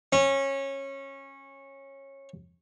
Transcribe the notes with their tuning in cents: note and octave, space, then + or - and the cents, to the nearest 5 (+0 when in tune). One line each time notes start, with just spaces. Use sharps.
C#4 -20